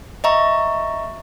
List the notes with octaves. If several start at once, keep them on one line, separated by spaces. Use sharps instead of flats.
D#5 E5 A#5 C#6